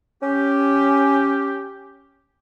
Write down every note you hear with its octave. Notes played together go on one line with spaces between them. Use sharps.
C#4 G4